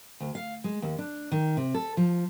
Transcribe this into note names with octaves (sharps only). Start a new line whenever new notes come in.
D2
F5
G#3
D#2
D4
D#3
C3
A4
F3